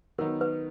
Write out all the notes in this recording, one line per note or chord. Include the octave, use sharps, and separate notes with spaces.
D#3 F#3 B3 D#4 A#4
B4